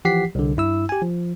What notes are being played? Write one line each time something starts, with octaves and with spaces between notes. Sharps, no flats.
E3 F3 G4 F#5 B6 C7
C2 D3
G2 E4 E6
G4 G#5
F3